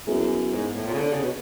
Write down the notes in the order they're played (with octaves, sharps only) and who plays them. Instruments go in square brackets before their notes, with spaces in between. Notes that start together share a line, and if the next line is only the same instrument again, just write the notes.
[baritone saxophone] F#2 [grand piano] B3 E4 G#4
[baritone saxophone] G#2
A2
A#2
C#3
D3
C#3
B2